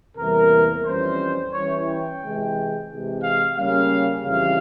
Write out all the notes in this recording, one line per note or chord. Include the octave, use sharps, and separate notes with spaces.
E2 C3 E3 G3 A#3 A#4
F2 E3 G3 C#4 C5
E3 G3 C#4 E4 C#5
G5
C3 E3 G#3
C3 E3 G#3
F5
C#3 G3 A#3 C#4 F5
F2 C#3 E3 G3 F5